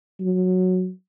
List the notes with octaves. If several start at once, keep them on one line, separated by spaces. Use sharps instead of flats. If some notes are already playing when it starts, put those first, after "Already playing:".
F#3